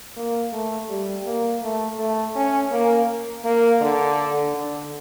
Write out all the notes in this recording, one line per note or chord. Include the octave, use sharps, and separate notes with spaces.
A#3
A3
G3
A#3
A3
A3
C#4
A#3
A#3
D3
D3